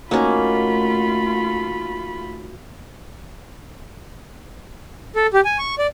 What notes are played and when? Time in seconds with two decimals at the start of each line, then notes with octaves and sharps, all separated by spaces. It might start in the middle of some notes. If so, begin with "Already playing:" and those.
0.11 A3 A#3 C#4 D#4 F4 F#4 G#5 B5
5.16 A4
5.34 G4
5.45 G#5
5.58 C#6
5.79 D5